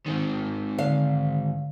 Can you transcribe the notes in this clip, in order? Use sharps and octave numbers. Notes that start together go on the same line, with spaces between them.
G#2 D#3
D3 F5